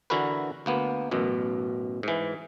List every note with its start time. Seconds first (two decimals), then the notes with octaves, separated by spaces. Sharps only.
0.10 D3 E3 E4 F#4 A#4 B4
0.66 D2 A#3 B3
1.11 A1 F#2 B2
2.03 G#2 E3